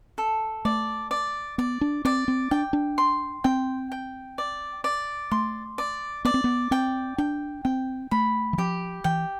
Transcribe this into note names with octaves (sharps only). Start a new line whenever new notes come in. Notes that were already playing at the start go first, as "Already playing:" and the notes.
A4
A3 D5
D5
B3 D5
D4
C4 D5
C4
D4 G5
D4
C6
C4 G5
G5
D5
D5
A3 C6
D5
B3 D5
C4
B3
C4 G5
D4 G5
C4 G5
A3 B5
E3
F3 G4
E3 G5